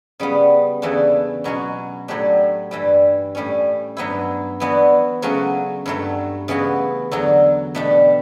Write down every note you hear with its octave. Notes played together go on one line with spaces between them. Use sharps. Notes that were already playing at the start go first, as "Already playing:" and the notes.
C#3 G3 B3
E2 C#3 E3 A3 D4
B2 F#3 C#4 F#4
A2 F#3 A3 D4 G4
G2 E3 G3
A2 G3 C#4
G2 F#3 B3 E4
E3 B3 D4 F#4
C#3 F#3 A3 C#4 F#4
G2 F#3 A3
C#3 E3 B3 F#4
E2 D3 F#3
B2 A3 D4 G4